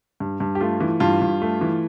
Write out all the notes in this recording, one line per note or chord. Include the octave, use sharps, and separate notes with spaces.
G2
G2
G4
A3 F4
E3
G2 F4
G2
A3
E3